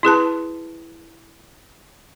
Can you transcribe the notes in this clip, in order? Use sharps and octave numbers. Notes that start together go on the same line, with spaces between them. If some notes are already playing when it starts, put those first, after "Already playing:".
E4 G#4 B4 A5